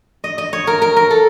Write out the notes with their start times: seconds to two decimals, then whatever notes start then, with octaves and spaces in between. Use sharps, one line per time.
0.24 D#5
0.38 D#5
0.53 C#5
0.67 A#4
0.82 A#4
0.96 A#4
1.11 A4